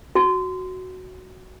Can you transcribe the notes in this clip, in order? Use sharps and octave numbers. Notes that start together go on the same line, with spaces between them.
F#4